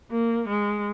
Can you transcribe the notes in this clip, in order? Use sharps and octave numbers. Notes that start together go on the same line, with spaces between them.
A#3
G#3